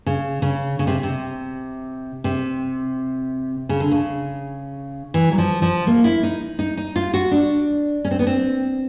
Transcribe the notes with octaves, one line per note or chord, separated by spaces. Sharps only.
C#3
C#3
C#3
C3
C3
C3
C#3
D3
C#3
E3
F#3
F3
F3
A#3
E4
D#4
D#4
D#4
F4
F#4
D4
C#4
C4
B3
C4